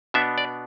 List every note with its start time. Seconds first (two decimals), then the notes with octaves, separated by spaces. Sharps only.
0.14 B2 B3 D4 E5
0.38 D5